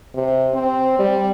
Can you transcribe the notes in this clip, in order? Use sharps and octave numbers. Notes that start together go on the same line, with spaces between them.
C3
C4
G3